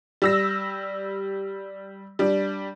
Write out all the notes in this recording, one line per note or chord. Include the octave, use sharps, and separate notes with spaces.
G3 E6 A#6
G3 D4